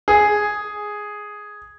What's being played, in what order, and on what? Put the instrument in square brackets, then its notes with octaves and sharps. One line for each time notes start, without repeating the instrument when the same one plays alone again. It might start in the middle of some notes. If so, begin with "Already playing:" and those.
[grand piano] G#4